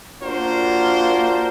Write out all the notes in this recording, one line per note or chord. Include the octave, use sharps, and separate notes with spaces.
A#3 D4 F4 F#4 A#4 C5